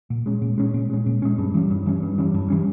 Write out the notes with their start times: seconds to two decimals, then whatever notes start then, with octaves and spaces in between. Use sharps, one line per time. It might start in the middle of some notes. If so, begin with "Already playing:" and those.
0.10 A#2
0.26 G#3 C#4
0.42 A#2
0.58 G#3 C#4
0.74 A#2
0.90 G#3 C#4
1.06 A#2
1.22 G#3 C#4
1.38 G2
1.54 E3 G3 C#4
1.70 G2
1.86 E3 G3 C#4
2.02 G2
2.18 E3 G3 C#4
2.34 G2
2.50 E3 G3 C#4